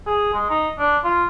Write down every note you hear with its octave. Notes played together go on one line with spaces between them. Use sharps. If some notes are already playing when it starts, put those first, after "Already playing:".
G#4
G#3
D#4
D4
F4